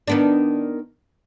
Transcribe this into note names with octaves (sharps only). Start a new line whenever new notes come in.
D#3 B3 D4